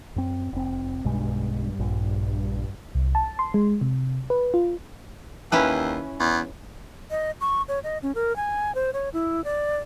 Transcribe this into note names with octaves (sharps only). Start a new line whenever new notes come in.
F#2 C4
F1 C4
B1 G2 B2 G#3
A#1
C2
A5
C6
G#3
C3
B4
F4
D#2 C#4 E4 B4
E2
D#5
C#6
C#5
D#5
C#4
A#4
G#5
C5
C#5
E4
D5